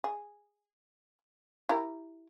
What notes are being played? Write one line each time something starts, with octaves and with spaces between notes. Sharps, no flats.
G#4
E4 G4 A#4